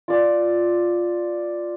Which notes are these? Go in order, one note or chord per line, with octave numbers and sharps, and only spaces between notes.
F4 D5